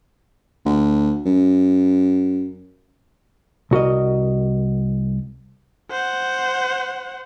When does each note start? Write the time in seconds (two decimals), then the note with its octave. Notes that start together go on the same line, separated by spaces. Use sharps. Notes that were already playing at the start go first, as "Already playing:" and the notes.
0.65 D2
1.26 F#2
3.71 C2 F#4 A#4 D#5
5.91 C5 F#5